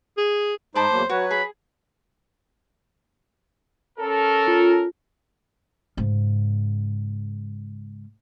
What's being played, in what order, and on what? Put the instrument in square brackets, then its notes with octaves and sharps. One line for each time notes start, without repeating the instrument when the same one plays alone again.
[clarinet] G#4
[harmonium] G#2 G#3 D#4 [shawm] C5 [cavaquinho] A5 B5 D6
[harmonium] E2 F#3 A#3
[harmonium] F#3 B4 C#5 [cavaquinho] F#4
[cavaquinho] G#4 [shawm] B5
[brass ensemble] C#4 A4 A#4
[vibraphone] F4
[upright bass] G#2 C#3